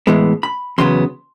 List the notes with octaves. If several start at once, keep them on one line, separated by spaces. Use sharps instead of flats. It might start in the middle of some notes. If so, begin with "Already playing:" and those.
A2 E3 G#3 B3
B5
E2 C#3 F#3 B3 C6